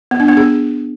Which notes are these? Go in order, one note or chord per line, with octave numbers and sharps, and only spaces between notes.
B3
D4
B3
G#4